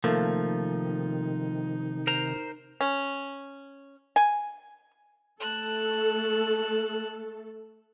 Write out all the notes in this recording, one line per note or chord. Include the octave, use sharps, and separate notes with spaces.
C3 D#3 F3 A3 A#3 D#4
A#4 C5 A#5
C#4
G#5
A3 A4 A5 F#6